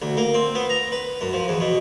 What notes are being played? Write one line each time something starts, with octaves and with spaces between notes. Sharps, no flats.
D2
A#3
C4
B3
A#5
B4
F#2
F3
E2
B2